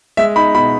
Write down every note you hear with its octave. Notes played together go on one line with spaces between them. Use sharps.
G#3 E5
D#4 B5
B2 B5